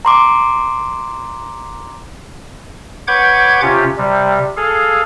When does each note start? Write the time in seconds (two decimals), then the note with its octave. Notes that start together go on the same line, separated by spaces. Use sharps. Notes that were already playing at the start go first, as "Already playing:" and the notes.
0.05 A#5 C6 D6
3.08 B4 C#5 F#5 D6 G6 G#6
3.62 C3 C#4 F4 G4
3.98 C3 G3
4.57 G#4 A4 F5